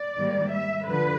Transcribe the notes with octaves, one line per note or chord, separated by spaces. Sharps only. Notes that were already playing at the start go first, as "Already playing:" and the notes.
Already playing: D5
G#2 D#3 G3 A#3
E5
D3 F3 B4